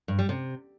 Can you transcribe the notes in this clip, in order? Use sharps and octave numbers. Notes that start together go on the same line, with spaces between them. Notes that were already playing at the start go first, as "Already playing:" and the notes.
G2
G3
C3